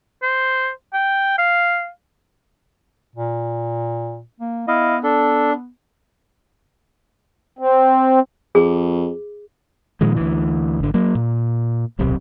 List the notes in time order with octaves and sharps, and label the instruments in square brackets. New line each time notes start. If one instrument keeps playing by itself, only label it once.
[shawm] C5
G5
F5
[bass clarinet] A#2
A#3
[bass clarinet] B3 [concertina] E4 D#5 F5
[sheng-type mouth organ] D4 [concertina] A4
[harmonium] C4
[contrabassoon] F2 [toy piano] G#4
[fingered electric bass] A#2 D#3 F3 G#3
D2 E3
G#1 D3
F#3 A#3
A#2
D1 B1 C3 C4